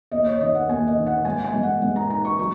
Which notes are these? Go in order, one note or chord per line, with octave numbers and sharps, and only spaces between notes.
D#2 D#5
C#5
D#3 D#5
F#5
D#2 G#5
D#5
D#3
F#5
G#2 G#5
G#5
G#3
F#5
G#3 F#5
A#5
D#4 A#5
C#6
F#3 C#6